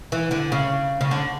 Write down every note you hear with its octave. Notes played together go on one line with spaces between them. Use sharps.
E3
D3
C#3
C#3
D3